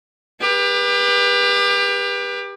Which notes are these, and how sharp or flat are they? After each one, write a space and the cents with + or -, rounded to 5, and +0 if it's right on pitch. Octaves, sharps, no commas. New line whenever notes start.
G4 +30 B4 -25